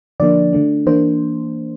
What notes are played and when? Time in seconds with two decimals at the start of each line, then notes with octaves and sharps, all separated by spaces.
0.20 D3 F3 A#3 D4 D5
0.53 D3 A3 D4
0.86 E3 A#3 D4 C5